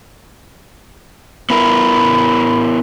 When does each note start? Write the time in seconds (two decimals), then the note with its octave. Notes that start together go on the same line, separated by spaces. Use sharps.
1.50 B3 E4 A#4 B5